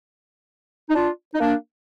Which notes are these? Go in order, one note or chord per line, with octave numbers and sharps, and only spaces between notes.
D#4
D4 F4
D#4
A#3 D4